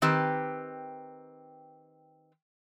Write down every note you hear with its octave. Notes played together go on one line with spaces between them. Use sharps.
D#3 C4 G4 B4